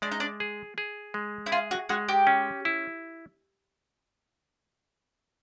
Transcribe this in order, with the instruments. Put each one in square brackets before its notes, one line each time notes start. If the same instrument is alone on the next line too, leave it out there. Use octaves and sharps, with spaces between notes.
[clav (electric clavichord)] G#3 [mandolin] D4
[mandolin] D#4
D4
[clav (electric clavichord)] G#4
G#4
G#3
[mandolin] E4
[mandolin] F4 [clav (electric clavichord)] G#4
[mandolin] F#4
[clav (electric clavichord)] G#3 [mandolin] F#4
[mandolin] G4
[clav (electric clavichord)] C#4
E4